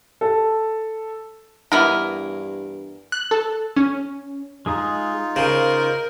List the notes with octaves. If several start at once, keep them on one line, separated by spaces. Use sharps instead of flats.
A4
G2 E3 B3 A#4
F#6
A4
C#4
G#3 D#4 F4 G#4 A#5
C#3 A#4 C5